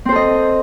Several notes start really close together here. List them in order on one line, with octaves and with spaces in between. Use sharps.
C4 C5 A4 D#5